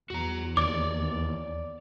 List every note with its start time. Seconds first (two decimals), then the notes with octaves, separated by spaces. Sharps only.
0.10 E2 F#4 A#5
0.57 D#2 C#5 D5 D6